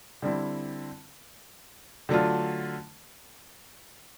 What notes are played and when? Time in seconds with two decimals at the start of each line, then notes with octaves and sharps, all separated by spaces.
0.22 D3 G3 C4 E4
2.09 D3 F#3 A3 D4 F4